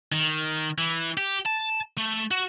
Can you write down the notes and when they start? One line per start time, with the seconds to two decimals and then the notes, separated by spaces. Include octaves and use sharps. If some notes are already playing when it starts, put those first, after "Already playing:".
0.12 D#3
0.78 E3
1.17 G4
1.45 A5
1.97 A3
2.31 F#4